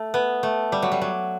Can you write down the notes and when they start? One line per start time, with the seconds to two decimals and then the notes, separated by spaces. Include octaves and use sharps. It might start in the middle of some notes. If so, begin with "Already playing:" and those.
Already playing: A3
0.14 B3
0.43 A3
0.72 G3
0.82 F#3
0.92 G3
1.01 F#3